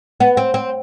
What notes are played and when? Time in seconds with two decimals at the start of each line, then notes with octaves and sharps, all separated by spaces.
0.20 B3
0.37 C4
0.54 C4